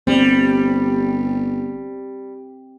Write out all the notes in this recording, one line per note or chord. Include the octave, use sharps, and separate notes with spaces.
G1 G3 C4